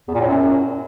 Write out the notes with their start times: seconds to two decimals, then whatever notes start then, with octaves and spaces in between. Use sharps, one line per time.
0.08 E2
0.14 A#2
0.21 A2
0.27 F#2